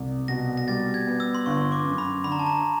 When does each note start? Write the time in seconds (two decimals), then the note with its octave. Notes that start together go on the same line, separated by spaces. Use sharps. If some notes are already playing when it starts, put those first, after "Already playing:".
Already playing: C2
0.28 B2 A#6
0.58 A#6
0.68 G3 A6
0.94 G#6
1.07 B3
1.20 E6
1.35 C6
1.46 G1 C#6
1.72 D6
1.86 F#2
1.98 B5
2.24 D3 B5
2.32 A#5
2.39 A5
2.46 A#5